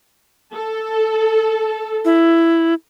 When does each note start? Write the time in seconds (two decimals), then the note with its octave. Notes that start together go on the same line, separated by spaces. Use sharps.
0.53 A4
2.05 E4